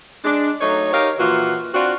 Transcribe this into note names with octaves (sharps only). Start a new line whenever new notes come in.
G#3 D4
F#3 A3 D#4 C#5
D#4 G4 A#4 C#5 F5
A#2 E3 F3 F4 F#4
C4 D4 F4 F#4